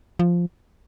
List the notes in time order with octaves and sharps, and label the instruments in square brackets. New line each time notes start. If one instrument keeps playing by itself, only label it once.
[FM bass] F3